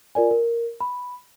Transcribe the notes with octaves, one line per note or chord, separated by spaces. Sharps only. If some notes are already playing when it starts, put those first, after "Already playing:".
F4 A#4 D5 G#5
A#4
B5